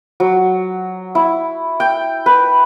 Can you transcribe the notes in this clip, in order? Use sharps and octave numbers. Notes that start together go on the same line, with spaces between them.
F#3
E4
G5
B4